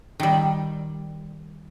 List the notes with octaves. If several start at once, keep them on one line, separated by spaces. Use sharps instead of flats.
D#3 G3